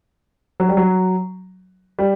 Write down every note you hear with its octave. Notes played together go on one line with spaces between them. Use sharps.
F#3
G3
F#3
G3